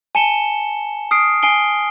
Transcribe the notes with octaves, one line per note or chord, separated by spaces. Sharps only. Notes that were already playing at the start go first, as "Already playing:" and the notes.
G#5 A5 C#7 E7 G7
D#6 F6 C7 D7
G#5 C7 D7 G7